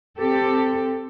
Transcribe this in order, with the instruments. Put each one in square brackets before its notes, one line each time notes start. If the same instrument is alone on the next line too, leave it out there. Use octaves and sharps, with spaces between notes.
[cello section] C4 G4 A4